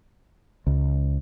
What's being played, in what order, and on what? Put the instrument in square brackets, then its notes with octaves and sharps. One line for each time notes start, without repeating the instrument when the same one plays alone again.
[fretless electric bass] C#2